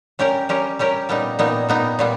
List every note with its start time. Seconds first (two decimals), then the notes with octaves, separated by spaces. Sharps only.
0.19 G3 C#4 G4 A#4
0.49 G3 C#4 G4 A#4
0.79 G3 C#4 G4 A#4
1.09 A#2 G3 B3 D#4
1.39 A#2 G3 B3 D#4
1.69 A#2 G3 B3 D#4
1.99 A#2 G3 B3